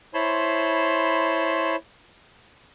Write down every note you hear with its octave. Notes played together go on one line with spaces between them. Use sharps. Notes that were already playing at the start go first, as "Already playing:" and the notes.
E4 C5 C#5 A5 B5 C6